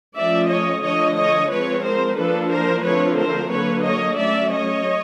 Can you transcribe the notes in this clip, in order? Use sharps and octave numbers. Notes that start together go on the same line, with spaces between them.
F3 A3 C#4 D5 E5
C#5 D#5
D3 F3 A3 C#5 D#5
C#5 D#5
F3 G#3 C4 B4 C#5
A#4 C5
F3 A#3 D4 A4 B4
A#4 C5
D3 F3 A3 C4 B4 C#5
A#4 C5
D3 F#3 A#3 B4 C#5
C#5 D#5
F#3 A3 C#4 D5 E5
C#5 D#5